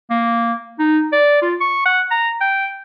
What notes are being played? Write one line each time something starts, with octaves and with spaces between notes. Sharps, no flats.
A#3
D#4
D5
F4
C#6
F#5
A#5
G5